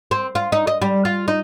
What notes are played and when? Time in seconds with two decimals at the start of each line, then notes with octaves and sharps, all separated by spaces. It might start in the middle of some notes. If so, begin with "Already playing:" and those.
0.11 C4
0.35 F4
0.52 D#4
0.67 D#5
0.82 G3
1.05 F4
1.28 D#4